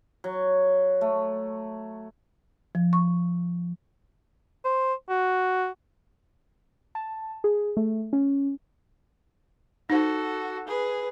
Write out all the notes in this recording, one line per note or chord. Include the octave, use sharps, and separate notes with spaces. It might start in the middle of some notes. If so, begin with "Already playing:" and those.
F#3
A3
F3
C#6
C5
F#4
A5
G#4
A3
C#4
D#4 F#4 A4 C5
G#4 B4